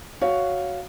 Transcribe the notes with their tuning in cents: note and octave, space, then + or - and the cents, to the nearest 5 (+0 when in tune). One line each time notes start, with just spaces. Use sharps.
F#4 +0 C#5 +5 F5 -10